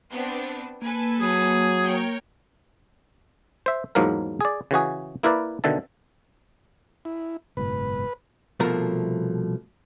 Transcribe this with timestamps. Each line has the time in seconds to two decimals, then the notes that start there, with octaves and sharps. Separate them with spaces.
0.11 B3 C4 D4
0.82 A#3 A4 B4 G#5
1.20 F#3 G#4
1.85 A#4 C#5 G5
3.66 C5 E5
3.95 E2 G#2 F3 F#3 A#3 A#4
4.41 G#4 D5
4.71 C#3 E3 F#4 G#4
5.23 A#3 E4 A#4 B4 D5
5.64 B2 D3 D#3 E5 A5
7.05 E4
7.57 F#1 G#2 B2 B4
8.60 C2 B2 F3 A3 A#4 A#5